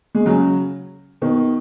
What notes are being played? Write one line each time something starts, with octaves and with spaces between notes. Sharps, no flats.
G#3
C#3 F#3
B2 D#3